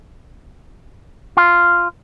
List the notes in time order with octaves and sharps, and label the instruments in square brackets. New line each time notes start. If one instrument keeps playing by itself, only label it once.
[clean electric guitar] F4